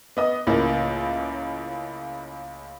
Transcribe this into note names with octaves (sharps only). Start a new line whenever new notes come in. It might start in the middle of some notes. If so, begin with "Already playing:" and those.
B3 D#5 D#6
C#2 A2 A#3